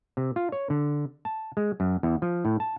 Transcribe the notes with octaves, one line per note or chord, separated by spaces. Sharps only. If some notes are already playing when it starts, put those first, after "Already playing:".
C3
F4
C#5
D3
A5
G#3
F#2
E2
F3
A2
A5